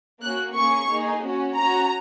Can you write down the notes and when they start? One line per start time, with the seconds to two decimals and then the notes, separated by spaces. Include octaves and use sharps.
0.22 A#3 C#4 F#4 F#6
0.55 A#3 C#4 G#4 C#6
0.89 A#3 D#4 G#4
1.23 C#4 F#4
1.56 C#4 F#4 A#5